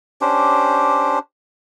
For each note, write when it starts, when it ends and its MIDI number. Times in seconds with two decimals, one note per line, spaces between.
0.21 1.19 61
0.21 1.19 62
0.21 1.19 67
0.21 1.19 72